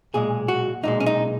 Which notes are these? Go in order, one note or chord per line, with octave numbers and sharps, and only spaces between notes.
B1 A#2 G#3 G#4
F#4
B1 A#2 G#3 D#4
C#4
D#4